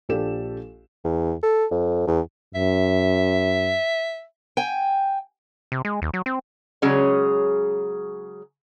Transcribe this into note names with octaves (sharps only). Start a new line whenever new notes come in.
A#1 D4 G4 A4 E7
E2
A4
F2
E2
F#2 E5
G5 G#5
C3
G#3
D#2
F#3
C4
C#3 F#3 G#3 C#4 G#4 C#5